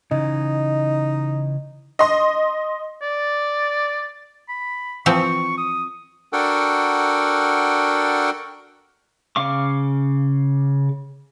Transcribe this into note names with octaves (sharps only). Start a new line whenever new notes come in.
C#3 E3 D#4 D#5
D#5 C6
D5
B5
E3 F3 C4 C#6
D#6
D4 F#4 A4 A#4 F#5 G5
C#3 F5 C#6 D6